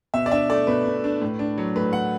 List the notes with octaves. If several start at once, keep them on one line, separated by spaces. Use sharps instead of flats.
B2 E5
D5
D4 E5
A3 D5
B2 B4
B2
D4
A2
D4
F#3
A2 B4
A2 F#5